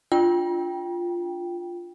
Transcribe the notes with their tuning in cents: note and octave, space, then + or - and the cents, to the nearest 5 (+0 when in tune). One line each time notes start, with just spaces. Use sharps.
D4 +0 F4 +0 G5 +0